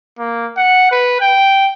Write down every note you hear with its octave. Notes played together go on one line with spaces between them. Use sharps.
A#3
F#5
B4
G5